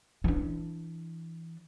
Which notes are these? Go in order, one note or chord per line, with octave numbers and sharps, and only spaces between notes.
E3 D4